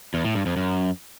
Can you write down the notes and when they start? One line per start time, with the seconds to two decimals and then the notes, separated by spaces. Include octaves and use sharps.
0.14 E2
0.24 A2
0.35 G2
0.46 F2
0.57 F#2